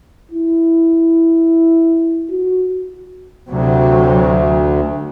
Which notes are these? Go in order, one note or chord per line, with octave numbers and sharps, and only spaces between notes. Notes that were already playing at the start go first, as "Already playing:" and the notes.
E4
F#4
D2 C3 F#3